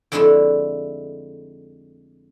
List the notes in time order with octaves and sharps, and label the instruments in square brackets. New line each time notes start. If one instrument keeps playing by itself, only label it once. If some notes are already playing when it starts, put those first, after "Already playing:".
[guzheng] F2 D3 G#3 A3 E4 A4